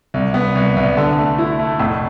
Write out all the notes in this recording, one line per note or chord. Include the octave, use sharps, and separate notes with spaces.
C2
B3
C2
C2
D3
A3
E4
A3
F1